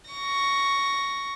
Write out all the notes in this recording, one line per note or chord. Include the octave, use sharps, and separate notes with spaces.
C#6 A#6